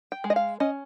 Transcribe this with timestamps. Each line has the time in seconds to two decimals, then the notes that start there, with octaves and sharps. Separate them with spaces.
0.12 G5
0.24 G#3
0.30 D#5
0.36 F5
0.60 C#4 D#5